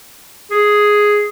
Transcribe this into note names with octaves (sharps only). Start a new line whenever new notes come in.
G#4